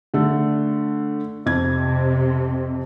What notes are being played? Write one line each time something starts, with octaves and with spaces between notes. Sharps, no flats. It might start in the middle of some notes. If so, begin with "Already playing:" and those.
D3 A3
F2 C3 G#6